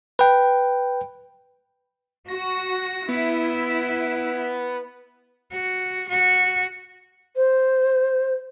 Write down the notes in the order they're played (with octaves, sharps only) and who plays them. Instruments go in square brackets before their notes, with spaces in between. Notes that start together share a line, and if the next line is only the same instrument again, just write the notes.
[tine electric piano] B4 G5
[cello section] F#4 [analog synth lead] A#6
[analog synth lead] B3 [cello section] E4
[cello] F#4
F#4
[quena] C5